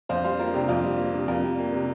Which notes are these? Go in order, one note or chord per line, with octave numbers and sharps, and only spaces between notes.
F2 C5 F5
G3 C5 F5
A#3 F4 A#4
C3 D4 G4
F2 F4
G3
A#3
C3
F2 F4 A#4
G3
A#3
C3